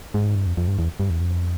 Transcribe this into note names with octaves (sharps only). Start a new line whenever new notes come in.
G#2
G2
F2
F2
G2
E2
G2
E2
F2